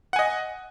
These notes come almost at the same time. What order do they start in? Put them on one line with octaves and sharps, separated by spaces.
F#5 G#5 D#5